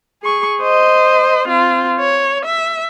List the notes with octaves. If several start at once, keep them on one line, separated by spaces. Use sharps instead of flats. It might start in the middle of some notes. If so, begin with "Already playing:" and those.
G#4 C#6
C5 D#5
C4 F4
C#5
E5